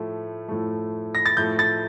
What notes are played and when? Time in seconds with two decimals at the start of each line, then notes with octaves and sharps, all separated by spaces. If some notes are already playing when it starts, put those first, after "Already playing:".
Already playing: A2 F3 A3
0.48 A2 F3 A3
1.15 A#6
1.26 A6
1.37 A2 F3 A3 G6
1.59 A6